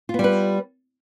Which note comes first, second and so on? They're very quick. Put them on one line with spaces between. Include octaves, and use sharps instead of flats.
F4 B3 G3 B4